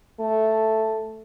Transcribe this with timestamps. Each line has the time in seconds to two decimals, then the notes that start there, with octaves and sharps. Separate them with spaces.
0.20 A3